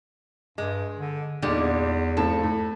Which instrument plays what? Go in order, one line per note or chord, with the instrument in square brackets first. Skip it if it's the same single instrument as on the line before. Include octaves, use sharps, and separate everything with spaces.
[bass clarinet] G2 [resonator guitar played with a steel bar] G#3
[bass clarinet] D3
[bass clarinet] E2 [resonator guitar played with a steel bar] A#2 G3 G#3 [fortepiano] D3 D#3
[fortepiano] F2 A2 C4 [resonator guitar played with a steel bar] A4
[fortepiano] A2